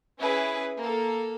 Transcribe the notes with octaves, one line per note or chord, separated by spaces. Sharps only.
C#4 E4 G#4 B4
A#3 A4